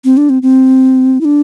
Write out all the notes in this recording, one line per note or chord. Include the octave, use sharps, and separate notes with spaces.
C4
D4
C4
C4
E4
D4